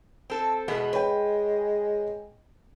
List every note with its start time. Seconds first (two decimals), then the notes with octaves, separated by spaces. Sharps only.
0.30 C4 A4
0.68 E2 B2 G#3 B3
0.93 B4 C#5 G5